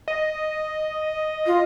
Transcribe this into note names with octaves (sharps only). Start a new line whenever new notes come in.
D#5
F4